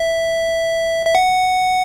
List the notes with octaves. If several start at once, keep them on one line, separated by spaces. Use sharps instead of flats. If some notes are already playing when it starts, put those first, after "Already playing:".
Already playing: E5
E5
F#5